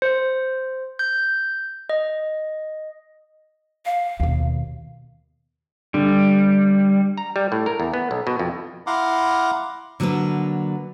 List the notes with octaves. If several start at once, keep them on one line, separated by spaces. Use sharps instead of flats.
C5
G6
D#5
F5
D#2 B2
D3 G3
A#5
G3
A2
A#4
E2
B3
B1
B2
F2
E4 F5 F#5 A#5 C6 D6
D3 F#3 A#3 D4 B4